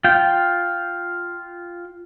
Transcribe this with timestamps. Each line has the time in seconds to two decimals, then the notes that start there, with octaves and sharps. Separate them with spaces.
0.04 F4 G5